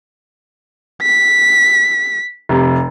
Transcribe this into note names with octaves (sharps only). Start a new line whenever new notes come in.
B6
F1 C3